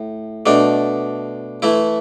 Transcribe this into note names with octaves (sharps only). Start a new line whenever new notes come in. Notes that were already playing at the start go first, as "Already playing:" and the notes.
Already playing: A2
B2 A3 D4
E3 A3 E4